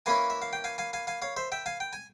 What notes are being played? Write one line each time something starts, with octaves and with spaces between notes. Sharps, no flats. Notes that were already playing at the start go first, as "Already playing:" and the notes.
E3 A#3 C#4 E4 F5 G#5
E5
F5
G5
F5 G#5
F5 G#5
F5 G#5
F5 G#5
C#5 F5
C5 E5
E5 G5
F5 G#5
G5
G#5